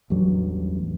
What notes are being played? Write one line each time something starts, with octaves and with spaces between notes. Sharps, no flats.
A1 E2 G2 F#3